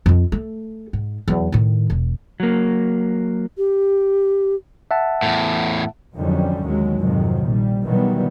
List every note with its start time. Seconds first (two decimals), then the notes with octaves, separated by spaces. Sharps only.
0.06 F2 F4
0.32 A3
0.93 G#2
1.28 E2 F#3
1.52 A2 D#3
1.90 E1
2.40 F#3 A#3
3.57 G4
4.91 E5 F#5 A5
5.22 E2 A2
6.16 F2 D3 D#3 F#3 G3 C#4
6.64 D#2 F#3 G#3
7.01 F2 G#2 C3 D#3 F3 F#3
7.44 A#1 A#2 G3
7.84 B2 D#3 E3 F#3 G3 B3